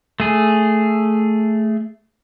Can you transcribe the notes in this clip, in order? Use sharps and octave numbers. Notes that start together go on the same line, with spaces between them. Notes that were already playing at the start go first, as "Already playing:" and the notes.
A3 G#4